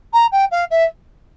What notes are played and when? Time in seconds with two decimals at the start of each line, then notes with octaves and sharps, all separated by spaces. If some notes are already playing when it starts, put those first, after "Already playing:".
0.13 A#5
0.32 G5
0.51 F5
0.70 E5